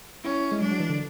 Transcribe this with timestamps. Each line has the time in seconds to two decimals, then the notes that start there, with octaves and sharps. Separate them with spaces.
0.24 C#4 E4
0.52 G#3
0.61 F#3 D4
0.71 F#3
0.80 E3
0.89 D3